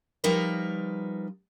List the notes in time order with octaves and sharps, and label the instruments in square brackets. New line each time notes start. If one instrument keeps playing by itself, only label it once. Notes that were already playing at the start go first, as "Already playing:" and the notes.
[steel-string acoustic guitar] F3 G3 D#4 A#4 B4